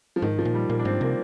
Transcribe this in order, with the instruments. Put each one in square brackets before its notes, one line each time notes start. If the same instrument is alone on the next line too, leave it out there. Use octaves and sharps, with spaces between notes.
[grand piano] F3
[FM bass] G#2 [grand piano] D#3
[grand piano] F3
[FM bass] A#2
[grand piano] G3
[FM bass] A#2 [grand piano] A#3
[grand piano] D4
[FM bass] G#2 [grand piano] C4
[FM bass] C3 [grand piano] A#3